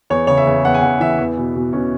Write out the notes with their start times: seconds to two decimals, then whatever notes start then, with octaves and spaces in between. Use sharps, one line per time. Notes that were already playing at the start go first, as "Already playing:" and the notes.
0.10 E2 C#5
0.27 C#3 C#5
0.37 E5
0.47 E2
0.65 E2 F#5
0.74 G#5
0.82 E2 F#5
1.00 E3 E5
1.18 E2
1.38 B2
1.55 B2
1.73 B2 C#4